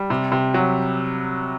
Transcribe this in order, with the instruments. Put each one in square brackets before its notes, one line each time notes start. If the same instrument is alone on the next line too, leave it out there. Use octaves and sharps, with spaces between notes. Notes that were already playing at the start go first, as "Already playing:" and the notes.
Already playing: [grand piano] G3
C3
C3
F#3